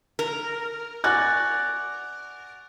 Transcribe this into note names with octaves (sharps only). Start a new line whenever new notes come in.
A#4
F#4 D5 G#5 F#6